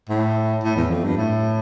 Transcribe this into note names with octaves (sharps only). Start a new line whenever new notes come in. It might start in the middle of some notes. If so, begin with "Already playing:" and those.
A2
A2
E2
F2
G2
A2